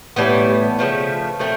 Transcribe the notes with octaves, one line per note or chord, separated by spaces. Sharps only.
A2 E3 G3 B3
C#3 F3 A3
A#2 F3 A3 C4